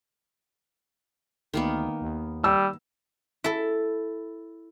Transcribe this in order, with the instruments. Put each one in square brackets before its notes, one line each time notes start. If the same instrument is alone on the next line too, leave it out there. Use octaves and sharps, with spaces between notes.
[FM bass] D2 [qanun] D#3 A#3 B3
[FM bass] D#2
[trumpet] G3 [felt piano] E6
[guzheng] E4 A4